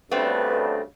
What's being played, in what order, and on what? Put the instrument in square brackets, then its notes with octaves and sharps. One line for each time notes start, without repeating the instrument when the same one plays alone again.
[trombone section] D2 G2 C#3 [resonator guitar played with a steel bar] A3 B3 C4 [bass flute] B4